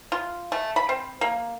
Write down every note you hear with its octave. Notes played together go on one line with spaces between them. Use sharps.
F4
A3
B5
C4
A#3